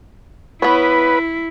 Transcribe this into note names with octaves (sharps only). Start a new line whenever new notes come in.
B3 E4 B4 C#5